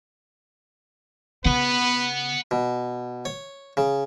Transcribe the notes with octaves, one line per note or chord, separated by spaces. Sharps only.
C#3 B3 B4 F#5 B5
B2
C#5
C#3